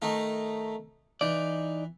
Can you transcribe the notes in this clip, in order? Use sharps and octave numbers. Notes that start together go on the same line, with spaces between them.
D#3 A3 D#4
E3 D#4 D5